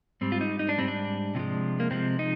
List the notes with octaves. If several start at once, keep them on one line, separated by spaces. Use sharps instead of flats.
G#2 G3 C4
F4
D#4
D#4
D4
G#2 G3 C4
D4
C3 F3 G#3
A#3
C3 F3 G#3 C4
D#4